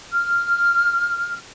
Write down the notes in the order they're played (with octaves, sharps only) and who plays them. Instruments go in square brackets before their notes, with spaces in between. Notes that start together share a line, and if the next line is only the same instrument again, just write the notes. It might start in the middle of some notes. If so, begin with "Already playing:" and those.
[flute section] F6